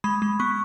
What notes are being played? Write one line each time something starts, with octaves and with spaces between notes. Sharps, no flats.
G#3 B5
G#3
B3 C#6